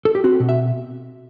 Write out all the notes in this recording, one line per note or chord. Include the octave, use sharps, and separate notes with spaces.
A4
G4
C4 F#4
B2
E5